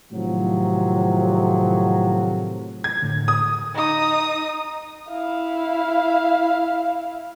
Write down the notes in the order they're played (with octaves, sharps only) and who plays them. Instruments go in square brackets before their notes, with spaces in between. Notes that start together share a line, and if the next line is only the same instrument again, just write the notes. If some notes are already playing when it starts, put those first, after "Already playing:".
[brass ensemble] A2 C3 D#3 F3 F#3
[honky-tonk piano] G#6
[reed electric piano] A2 D3
[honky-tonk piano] D#6
[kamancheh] D#4 D#6
E4 F5